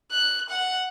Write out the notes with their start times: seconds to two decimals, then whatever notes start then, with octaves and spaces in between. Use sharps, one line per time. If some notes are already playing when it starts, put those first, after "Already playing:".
0.12 F#6
0.50 F#5